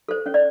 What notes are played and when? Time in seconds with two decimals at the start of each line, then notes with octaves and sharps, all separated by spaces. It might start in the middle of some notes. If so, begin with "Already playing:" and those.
0.09 A4 C5
0.26 C#4 C#5
0.34 D5